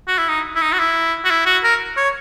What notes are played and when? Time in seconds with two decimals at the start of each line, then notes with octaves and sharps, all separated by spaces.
0.08 F#4
0.18 E4
0.28 D#4
0.55 E4
0.62 D#4
0.73 F#4
0.79 E4
1.25 F#4
1.30 E4
1.46 F#4
1.63 A#4
1.97 C#5